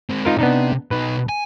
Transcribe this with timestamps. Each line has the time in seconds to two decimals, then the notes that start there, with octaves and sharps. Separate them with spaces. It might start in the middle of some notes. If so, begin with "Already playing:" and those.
0.10 G#3 C4
0.25 D#4 F4 A#4
0.39 C3 B3 D4 D#4
0.91 B2 D#4 B4
1.29 G#5